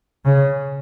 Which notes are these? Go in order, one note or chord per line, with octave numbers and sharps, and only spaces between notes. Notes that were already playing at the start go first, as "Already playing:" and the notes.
C#3